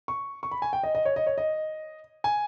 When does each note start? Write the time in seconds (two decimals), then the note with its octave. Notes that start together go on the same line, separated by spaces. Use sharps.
0.08 C#6
0.43 C#6
0.51 B5
0.62 G#5
0.73 G5
0.83 D#5
0.95 D#5
1.05 C#5
1.16 D#5
1.26 C#5
1.38 D#5
2.24 G#5